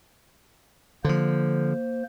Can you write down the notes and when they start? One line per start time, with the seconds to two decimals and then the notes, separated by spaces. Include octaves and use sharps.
1.05 D3 F3 A#3 C5